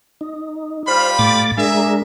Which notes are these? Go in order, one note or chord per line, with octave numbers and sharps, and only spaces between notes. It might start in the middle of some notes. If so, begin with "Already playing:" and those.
D#4
G3 F4 C5 F5 B5
A2 D6 A6
G#3 D4 G#4 A#4 E5